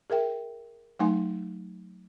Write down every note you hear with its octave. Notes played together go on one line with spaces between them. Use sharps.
G#4 A#4 E5 G5
F#3 A3 D#4 F#5 G#5 C6